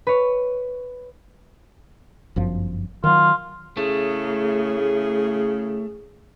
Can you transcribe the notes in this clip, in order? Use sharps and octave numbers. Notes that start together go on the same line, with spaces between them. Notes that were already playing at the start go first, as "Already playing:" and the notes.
B4 C#5
G1 F#2 F3
D#3 F#3 F4
A2 C#3 A3 G#4